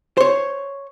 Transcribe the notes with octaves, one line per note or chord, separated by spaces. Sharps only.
C5 C#5